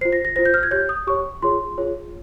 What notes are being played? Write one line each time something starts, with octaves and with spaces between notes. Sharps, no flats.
F4 C5 C7
A#6
A#6
F4 C5 A#6
G6
F6
G#6
G4 C#5 G6
D#6
G4 C#5 C#6
F4 G#4 C#5 C6
F4 G#4 C#5